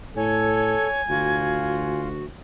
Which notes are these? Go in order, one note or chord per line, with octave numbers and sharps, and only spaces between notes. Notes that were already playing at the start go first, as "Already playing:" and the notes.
A2 A4 C#5 G#5
D2 F4 F#4